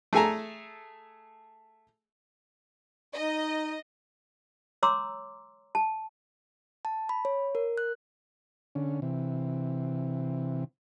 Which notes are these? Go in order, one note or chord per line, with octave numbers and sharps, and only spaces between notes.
A3 G#4 A4 G#5 A#5
D#4 D#5
C#5 A#5 C6 D6 E6
A5
A5
B5
C#5
A#4
F#6
D3 C#4
C3 E3